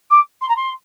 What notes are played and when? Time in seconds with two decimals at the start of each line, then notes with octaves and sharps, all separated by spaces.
0.10 D6
0.41 C6
0.49 A#5
0.56 C6